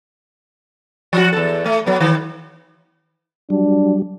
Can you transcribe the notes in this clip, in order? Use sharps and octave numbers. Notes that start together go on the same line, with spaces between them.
F3 F#4
E2 A4
A3
F#3 B3
D#3
F#3 G3 D4